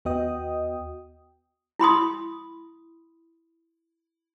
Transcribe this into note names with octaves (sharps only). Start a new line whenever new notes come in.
D#2 B3 F#4 D#5 G5 D#6
E4 B5 C6 D#6